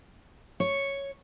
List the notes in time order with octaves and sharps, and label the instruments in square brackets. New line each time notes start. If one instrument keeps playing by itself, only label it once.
[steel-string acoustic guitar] C#5